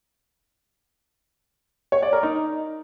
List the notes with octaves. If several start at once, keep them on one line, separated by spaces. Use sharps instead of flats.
C#5
D5
A#4
D#4